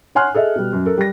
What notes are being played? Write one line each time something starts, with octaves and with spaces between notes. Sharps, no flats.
C#5 F#5 G#5 C6 F6 F#6
G#4 A4 D#5 E5
B2 G3
F#2
A4 A#4
G3 A#6